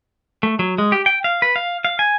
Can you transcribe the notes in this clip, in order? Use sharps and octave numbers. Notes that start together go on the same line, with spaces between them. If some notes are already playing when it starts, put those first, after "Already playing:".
A3
F#3
G#3
G4
G5
F5
B4
F5
F5
G#5